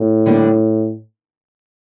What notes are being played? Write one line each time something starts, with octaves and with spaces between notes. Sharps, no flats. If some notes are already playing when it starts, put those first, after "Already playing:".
Already playing: A2
D3 G3 A#3 D4 G4